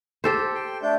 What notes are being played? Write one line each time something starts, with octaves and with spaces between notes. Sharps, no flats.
G4 A4 C5
G5 C6
A3 D4 G6